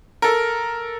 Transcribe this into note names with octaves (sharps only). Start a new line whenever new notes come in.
A4 A#4